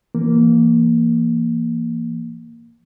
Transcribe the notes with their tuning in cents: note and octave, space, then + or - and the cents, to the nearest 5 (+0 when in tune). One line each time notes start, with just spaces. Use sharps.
E3 +30 A#3 +0